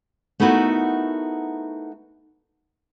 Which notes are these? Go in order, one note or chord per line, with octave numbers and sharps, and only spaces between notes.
A3 B3 D#4 E4 F#4 A#4